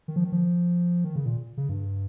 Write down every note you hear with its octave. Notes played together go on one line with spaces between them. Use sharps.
D#3
F3
D#3
F3
D#3
C#3
A#2
C#3
G2